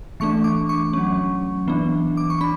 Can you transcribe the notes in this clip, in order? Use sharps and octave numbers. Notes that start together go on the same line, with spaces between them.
E3 A3 D4 C#6
D6
C#6
F#3 C#4
E3 B3 D4
D6
C#6
D4 B5